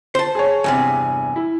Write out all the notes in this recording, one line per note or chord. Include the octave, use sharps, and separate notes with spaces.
C5 A5
G#4 C#5
E2 G2 C3 G#5
E4